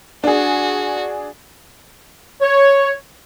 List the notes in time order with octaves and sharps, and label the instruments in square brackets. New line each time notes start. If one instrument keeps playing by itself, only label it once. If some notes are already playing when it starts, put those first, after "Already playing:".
[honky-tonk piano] D4 G#4 [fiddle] F#4
[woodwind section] C#5